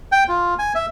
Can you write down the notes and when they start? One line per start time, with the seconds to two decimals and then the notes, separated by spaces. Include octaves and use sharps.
0.12 G5
0.29 F4
0.59 G#5
0.75 E5